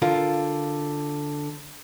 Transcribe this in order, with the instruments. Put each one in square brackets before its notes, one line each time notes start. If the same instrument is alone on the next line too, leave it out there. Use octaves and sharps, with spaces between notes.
[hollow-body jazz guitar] D3 F4 A#4